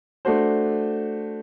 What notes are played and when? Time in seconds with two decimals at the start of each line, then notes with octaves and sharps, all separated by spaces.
0.25 A3 D4 F#4 C5